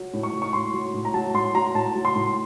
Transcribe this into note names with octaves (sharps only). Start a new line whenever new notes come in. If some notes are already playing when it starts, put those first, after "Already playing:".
Already playing: F#3
A2
C#6
F#3
C#6
A2 C6
F#3
A2
A#5
F#3 A5
A2 C6
F#3 A#5
A2 A5
F#3
C6
A2